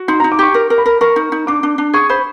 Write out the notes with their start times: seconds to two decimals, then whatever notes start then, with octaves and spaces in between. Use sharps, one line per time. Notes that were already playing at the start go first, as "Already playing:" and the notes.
Already playing: F#4
0.08 D#4 C6
0.20 A#5
0.24 D#4
0.32 D6
0.39 G4 C#6
0.54 A#4
0.70 A#4
0.78 B5
0.86 A#4
1.01 A#4 C#6
1.16 D#4
1.32 D#4
1.47 D4 D6
1.63 D4
1.78 D4
1.93 G#4 C#6
2.09 C5 B5